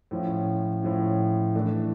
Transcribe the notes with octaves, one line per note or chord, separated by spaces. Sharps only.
A2 F3 C#4
A2 F3 C#4
E3 A3 D4